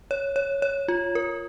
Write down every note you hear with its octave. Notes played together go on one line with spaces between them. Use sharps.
C#5
C#5
C#5
F4
A#4